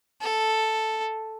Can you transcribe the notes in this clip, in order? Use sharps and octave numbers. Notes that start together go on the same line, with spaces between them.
A4